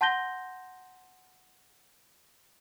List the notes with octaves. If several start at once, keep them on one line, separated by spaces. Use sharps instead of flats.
F#5 A5 C6 G6 A#6 G7